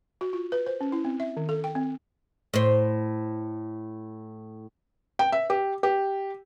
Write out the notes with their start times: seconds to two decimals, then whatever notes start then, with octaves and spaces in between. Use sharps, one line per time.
0.21 F#4
0.33 F4
0.52 B4
0.66 C5
0.81 C#4
0.92 E4
1.05 C4
1.20 E5
1.37 D#3
1.49 A4
1.64 G5
1.75 C4
2.54 A2 C5
5.19 G5
5.32 E5
5.50 G4
5.83 G4